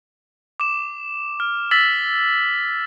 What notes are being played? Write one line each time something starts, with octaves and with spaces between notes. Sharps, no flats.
D6 E7
F6
E6 A6 B6 F#7